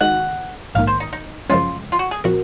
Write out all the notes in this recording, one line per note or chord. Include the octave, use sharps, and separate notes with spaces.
D#3 G#3 D#4 F#4 F#5
A#1 G#2 D#3 A#3 F5
C5
D#4
D#4
F#2 C#3 F3 G#3 C#4 F4
F4
F#4
G#4
A#2 F3 C4 F#4 A#4